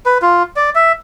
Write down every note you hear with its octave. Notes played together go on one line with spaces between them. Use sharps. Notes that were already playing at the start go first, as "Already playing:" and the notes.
B4
F4
D5
E5